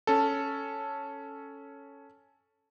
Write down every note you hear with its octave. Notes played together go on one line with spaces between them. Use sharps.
C#4 A4